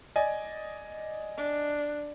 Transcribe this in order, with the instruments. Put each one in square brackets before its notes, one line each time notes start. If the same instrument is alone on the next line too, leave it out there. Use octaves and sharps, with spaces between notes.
[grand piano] D5 D#5 G#5
[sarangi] D4